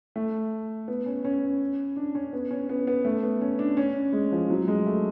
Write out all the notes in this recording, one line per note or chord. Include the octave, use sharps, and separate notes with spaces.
A3
B3
C#4
C#4
D4
C#4
B3
C#4
B3
B3
A3
B3
C#4
D4
C#4
G#3
F3
F#3
G#3
A3